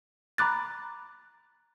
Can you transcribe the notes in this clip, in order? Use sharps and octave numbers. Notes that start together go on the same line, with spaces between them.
A#5 B5 D6 F#6 A6